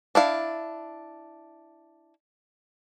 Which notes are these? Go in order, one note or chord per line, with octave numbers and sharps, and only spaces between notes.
D4 E4 F5